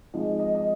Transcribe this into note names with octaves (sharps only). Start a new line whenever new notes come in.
G#1 G#2 F3 G#3 D#5
D#5
D#5